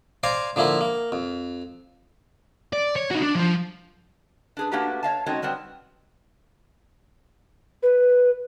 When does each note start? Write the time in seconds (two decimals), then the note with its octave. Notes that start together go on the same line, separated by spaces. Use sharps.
0.23 C5 D5 F5 G#5 A#5
0.56 D3 F3 A#3 E4
0.81 A#3
1.12 F2
2.73 D5
2.96 C#5
3.11 D#4 F#4
3.22 D4
3.35 F3 F4
4.57 D4 G#4 B4
4.72 A3 A#3 D4 F#4 G4 B4
5.03 C#5 D#5 F5 A5
5.26 G#3 C4 C#4 D#4 F#4 A4
5.42 F#3 G3 B3 C4
7.83 B4